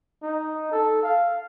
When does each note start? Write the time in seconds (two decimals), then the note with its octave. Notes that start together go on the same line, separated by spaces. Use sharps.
0.22 D#4
0.71 A4
1.03 F5